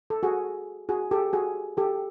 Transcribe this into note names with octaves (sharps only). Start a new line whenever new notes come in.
A4
F#4 G#4
F#4 G#4
G4 A4
F#4 G#4
G4 A4